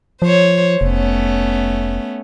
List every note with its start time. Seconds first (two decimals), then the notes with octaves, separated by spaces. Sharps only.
0.22 F3 C5 C#5
0.81 F1 A3 B3 C#4